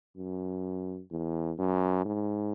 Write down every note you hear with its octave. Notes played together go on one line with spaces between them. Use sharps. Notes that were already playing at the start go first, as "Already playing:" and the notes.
F#2
E2
F#2
G#2